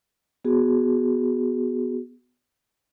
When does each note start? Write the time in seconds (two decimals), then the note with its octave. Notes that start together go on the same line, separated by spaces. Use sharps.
0.45 B3 F#4 G#4